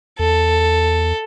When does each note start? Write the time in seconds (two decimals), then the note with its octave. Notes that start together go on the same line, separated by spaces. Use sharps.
0.19 E2 A4